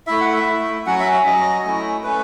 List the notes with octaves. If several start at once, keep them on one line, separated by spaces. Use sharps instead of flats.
A3 E4 E5
F#5
E5
A3 E4
F#3 C#4 F#4 F#5
E5
E5
F#3 C#4 F#4 D#5
A3 C#4 E4
A3 C#4 B4